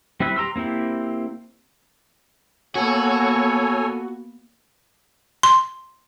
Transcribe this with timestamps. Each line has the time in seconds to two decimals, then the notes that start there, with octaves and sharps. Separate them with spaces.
0.20 G3 C4 E4 B4 E5
0.36 G4 A#5 C6 E6
0.56 A#3 C4 E4 G4
2.75 A#3 B3 F#4 A4 C#5 G#5
5.43 C6